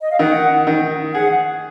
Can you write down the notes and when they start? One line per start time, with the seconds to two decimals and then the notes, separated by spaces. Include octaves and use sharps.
0.01 D#5
0.11 F5
0.19 D#3 F#5
0.67 D#3
1.13 G#4 F#5